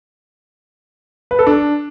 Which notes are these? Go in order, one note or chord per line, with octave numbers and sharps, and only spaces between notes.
B4
A4
D4